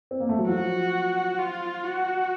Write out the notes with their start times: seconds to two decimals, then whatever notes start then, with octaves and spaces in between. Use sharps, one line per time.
0.11 C4
0.20 A#3
0.29 A3
0.39 F#3
0.47 F3 F#4
1.39 F4
1.84 F#4